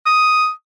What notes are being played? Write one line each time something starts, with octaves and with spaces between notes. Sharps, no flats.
D#6